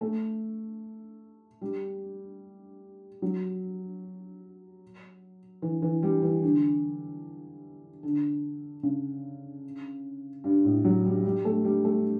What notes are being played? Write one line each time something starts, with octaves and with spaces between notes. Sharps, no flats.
A3
G3
F#3
E3
E3
G3
E3
D3
D3
C#3
G2
A2
F#3
G3
G3
A3
G3
A3